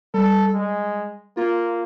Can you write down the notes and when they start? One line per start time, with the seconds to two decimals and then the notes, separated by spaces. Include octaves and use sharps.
0.14 G3 A4
0.54 G#3
1.37 A#3 F4